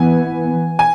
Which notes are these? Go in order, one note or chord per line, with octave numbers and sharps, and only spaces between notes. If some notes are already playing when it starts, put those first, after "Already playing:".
Already playing: E3 B3 G#5
G#5